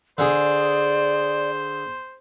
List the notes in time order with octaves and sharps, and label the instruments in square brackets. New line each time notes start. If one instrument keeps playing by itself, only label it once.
[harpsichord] D3 G#4 D#6 [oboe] C5 [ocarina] D5